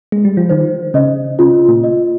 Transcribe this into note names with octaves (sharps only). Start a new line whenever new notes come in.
G#3
G3
F3
D#3 C5
C#3 D#5
C#3 F4
A#2
D#5